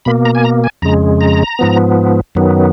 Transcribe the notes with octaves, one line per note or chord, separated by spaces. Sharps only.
B2 A#3 B5
A#5
G#5
A#5
G#5
F2 C#3 G#3 A#5
A#5
G#2 F3 B3
F#2 D#3 F#3 B3